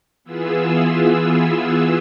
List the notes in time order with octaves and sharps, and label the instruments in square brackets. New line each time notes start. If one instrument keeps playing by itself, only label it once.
[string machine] E3 B3 F4 G#4 E6